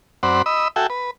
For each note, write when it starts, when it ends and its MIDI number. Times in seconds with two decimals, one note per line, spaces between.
0.23 0.42 42
0.23 0.42 60
0.23 0.42 72
0.23 0.42 74
0.23 0.42 78
0.23 0.42 83
0.46 0.68 75
0.46 0.68 83
0.46 0.68 88
0.76 0.87 66
0.76 0.87 69
0.76 0.87 76
0.76 0.87 79
0.76 0.87 80
0.90 1.11 71